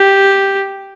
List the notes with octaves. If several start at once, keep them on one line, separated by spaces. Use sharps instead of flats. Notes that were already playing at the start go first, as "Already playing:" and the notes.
Already playing: G4